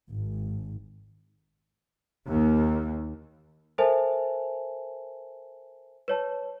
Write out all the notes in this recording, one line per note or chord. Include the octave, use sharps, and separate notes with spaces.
G#1
D#2
A4 A#4 C5 E5 G#5 A5
B4 C#5 A5